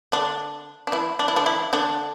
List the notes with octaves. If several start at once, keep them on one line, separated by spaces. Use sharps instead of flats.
D3 D4
D4
E3 E4
D4
E4
D3 D4
E3 E4
D3 D4